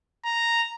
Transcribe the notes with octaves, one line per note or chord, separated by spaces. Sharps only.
A#5